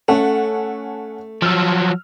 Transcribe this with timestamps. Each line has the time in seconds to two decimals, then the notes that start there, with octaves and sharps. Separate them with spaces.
0.08 A3 C#4 A4 F#5
1.42 F3 F#3 E6 F6